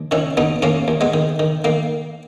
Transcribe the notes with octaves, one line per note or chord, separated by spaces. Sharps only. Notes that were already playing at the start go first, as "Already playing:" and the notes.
Already playing: D#2
D#3 C#4 E4
D#2 B3 D#4
D#2 A#3 C#4
D#2
G#3 B3
D#3
D#3
D#3 A#3